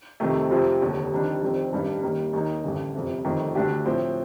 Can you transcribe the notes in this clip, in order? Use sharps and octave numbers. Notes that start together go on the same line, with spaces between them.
F2 C3 D#3 A3
F2 C3 G3 C4 F4
F1 D#2 D3
F1 F2 D#3 G3 D4
F1 F2 D#3 G3 C4
A1 G2 D#3 G3 D4
D#2 D#3 G3 A#3
D#2 D#3 A#3 D#4
A1 G2 D3
G1 F2 C3
G1 F2 D#3 A3
D2 D3 A3 D4 G4
A2 F3 C4